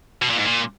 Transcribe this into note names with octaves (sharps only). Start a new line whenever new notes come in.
B2
A#2
G#2
A#2